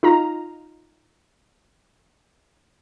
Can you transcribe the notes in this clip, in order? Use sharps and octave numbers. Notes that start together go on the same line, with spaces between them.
D#4 F4 A#5